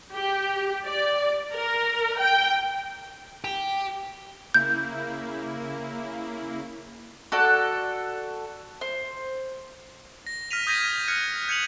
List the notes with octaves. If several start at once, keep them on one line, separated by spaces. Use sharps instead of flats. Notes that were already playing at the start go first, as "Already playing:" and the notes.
G4
D5
A#4
G5
G4
C#3 A#3 E4 G6
F#4 A4 D5 F#6
C5
A#6
F6 A#6 B6 D#7 F7
D#6 G6 G#6 A#6 B6 D#7
F6 F#6 G#6 C#7
G6 G#6 C#7 D#7 F7 F#7